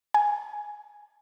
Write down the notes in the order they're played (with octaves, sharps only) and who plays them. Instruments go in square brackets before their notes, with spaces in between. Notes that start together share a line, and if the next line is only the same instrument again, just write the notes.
[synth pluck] G#5